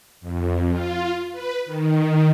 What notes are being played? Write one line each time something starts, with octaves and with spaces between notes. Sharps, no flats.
F2
F4
B4
D#3